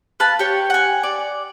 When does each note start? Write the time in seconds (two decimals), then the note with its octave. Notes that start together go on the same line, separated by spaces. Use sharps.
0.20 B4 F5 A5
0.39 G4 C#5
0.70 F#5 G#5
1.03 D5